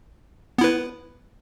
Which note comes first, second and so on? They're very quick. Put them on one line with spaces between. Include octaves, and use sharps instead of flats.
B3 E4 B4